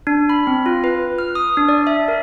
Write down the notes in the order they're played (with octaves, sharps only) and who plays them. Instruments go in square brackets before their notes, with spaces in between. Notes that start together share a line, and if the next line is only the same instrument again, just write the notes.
[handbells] D4
B5
C4
F4
B4
F6
D#6
D4
D5
E5
A#4